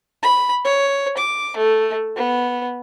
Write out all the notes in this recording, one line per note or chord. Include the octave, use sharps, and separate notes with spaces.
B5
C#5
D6
A3
B3